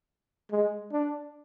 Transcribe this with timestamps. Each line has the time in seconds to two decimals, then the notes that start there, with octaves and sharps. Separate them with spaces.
0.51 G#3
0.92 D4